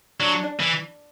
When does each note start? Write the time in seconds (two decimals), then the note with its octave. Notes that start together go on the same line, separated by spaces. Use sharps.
0.20 F#3 D4
0.60 E3